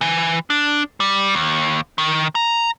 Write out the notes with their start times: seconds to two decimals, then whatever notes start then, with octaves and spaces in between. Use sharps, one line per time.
0.01 E3
0.50 D4
1.00 G3
1.35 D#2
1.98 D#3
2.35 A#5